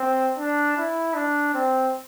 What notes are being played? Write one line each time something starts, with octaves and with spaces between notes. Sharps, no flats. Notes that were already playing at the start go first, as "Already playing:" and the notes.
Already playing: C4
D4
E4
D4
C4